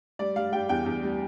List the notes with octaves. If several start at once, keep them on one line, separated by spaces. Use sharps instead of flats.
G3 D5
G3 F5
G3 G5
E2 G5
E2
G3